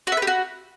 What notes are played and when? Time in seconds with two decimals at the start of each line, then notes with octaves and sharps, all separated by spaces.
0.07 F#4
0.12 E5
0.17 B4
0.22 G4
0.27 F#4